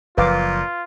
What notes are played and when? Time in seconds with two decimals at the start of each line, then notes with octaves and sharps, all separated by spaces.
0.18 F#1 A#2 F3 F4 B4 F5 D6